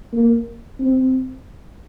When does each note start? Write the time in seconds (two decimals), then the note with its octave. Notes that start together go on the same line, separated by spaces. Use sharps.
0.13 A#3
0.79 C4